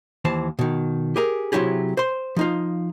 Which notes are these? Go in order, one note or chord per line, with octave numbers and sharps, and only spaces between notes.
D#2 E3 C5 A5
B2 D#3
G4 G#4 A#4
C3 F3 F#3 E4 G4 G#4
C5 C6
F3 D#4 F4